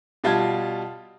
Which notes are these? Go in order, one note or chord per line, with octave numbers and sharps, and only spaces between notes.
B2 G3 F4 A5 G#6